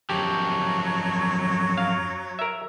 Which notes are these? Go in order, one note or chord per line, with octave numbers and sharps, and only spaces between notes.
F#2 F3 F#3 G4
F5
A#4 E5